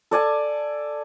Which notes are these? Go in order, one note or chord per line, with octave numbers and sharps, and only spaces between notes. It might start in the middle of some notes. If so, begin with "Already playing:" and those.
A4 D5 G#5 A5